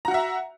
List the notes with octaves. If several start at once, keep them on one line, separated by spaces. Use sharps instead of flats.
F#4 E5 F#5 A#5